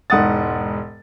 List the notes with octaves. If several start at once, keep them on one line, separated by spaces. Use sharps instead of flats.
E1 G#2 F#5 D#6 A6